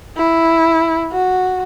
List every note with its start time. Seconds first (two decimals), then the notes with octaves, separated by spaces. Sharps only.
0.16 E4
1.12 F#4